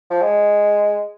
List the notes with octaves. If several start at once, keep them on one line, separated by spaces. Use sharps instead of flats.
F3
G#3